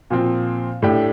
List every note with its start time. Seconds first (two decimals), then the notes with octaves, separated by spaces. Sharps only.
0.10 A#2 F3 C4
0.82 A2 A3 D4 G4